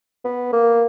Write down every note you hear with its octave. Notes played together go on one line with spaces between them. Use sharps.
B3
A#3